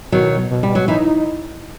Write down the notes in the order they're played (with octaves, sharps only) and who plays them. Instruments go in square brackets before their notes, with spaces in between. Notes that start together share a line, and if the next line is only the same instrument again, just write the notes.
[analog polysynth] B2 [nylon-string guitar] D#3 F#3
[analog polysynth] B2
[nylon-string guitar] G3
F#3
[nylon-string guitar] E3 [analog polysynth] D#4